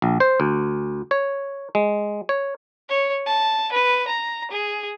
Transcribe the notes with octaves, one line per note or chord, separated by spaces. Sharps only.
A#1
C5
D2
C#5
G#3
C#5
C#5
A5
B4
A#5
G#4